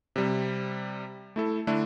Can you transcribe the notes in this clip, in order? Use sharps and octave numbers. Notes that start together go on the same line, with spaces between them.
C3 G3 C4
A3 E4 A4
D3 A3 D4 E4